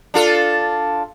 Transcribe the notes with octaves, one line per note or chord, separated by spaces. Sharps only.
D4 F4 A4